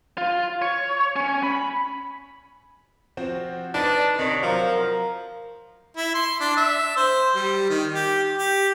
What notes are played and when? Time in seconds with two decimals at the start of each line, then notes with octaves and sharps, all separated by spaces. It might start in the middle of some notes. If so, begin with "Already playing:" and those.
0.18 F4
0.62 C#5
1.16 C#4
1.43 B5
3.17 F3 C4 F#4
3.74 D4 D#4 B4 A6
4.19 C3 D#3 C#5 D5
4.43 F3 F#3 A#4
5.97 E4
6.14 C6
6.40 D4
6.57 E5
6.97 C5
7.35 G3
7.69 D#3
7.94 G4
8.37 G4